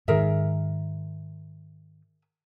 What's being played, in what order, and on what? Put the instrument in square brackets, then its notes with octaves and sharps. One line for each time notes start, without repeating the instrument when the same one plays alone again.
[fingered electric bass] G#2 D#3 [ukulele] G#4 A#4 E5